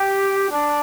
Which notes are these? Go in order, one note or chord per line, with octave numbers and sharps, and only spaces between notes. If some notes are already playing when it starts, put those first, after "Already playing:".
Already playing: G4
D4